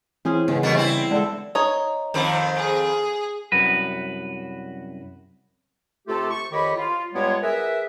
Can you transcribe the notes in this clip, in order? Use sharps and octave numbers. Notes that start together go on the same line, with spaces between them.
E3 C4 C#4 E4 F4 G#4 C5
G#2 C#3 B3
E2 B2 G3 A#3
C4 E4 E5
D3 G#3 A4
D#4 C#5
F2 D#3 C4
G#4
C2 F#2 F#4 B4
C3 A3 F4 G4 A4
C#6
F2 D#3 G4 C#5 D#5 B5
F4
G2 G3 G#3 B3 F4 C#5
G#4 A#4 B4 E5